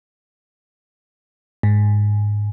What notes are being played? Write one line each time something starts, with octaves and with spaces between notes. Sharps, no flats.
G#2